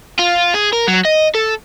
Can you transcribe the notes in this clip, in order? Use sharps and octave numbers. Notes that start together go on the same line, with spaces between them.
F4
G#4
A#4
F#3
D#5
A4